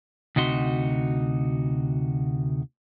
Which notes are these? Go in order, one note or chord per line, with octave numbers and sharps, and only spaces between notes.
D2 C3 D#4 F#4 C6